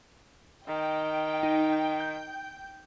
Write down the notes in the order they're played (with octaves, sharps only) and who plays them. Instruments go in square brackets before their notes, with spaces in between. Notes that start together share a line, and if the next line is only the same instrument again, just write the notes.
[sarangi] D#3 [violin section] G5
[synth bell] D#4
G6